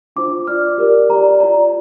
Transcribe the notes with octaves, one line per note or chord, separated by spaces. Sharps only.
D4 F4 C5 D6
F4 D5 F6
G4 A#4 D5
G4 D5 A#5
F4 D5 A#5